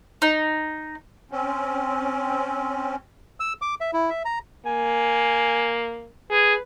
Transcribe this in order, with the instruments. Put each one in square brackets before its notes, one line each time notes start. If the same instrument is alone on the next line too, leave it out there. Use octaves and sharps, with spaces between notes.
[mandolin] D#4
[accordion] C4 C#4
[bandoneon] E6
D6
E5
E4
E5
A#5
[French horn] A#3 [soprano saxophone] G#5
[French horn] G#4 [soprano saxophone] B4